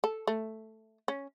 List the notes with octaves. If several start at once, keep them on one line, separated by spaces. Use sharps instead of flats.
A4
A3
C#4